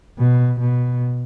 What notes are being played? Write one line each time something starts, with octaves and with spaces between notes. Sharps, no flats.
B2
B2